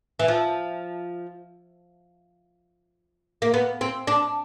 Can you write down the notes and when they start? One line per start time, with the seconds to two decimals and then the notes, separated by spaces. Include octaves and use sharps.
0.19 E3
0.28 F3
3.42 A#3
3.54 B3
3.81 C4
4.07 D4